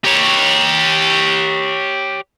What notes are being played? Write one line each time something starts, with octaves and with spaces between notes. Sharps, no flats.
G4 C#5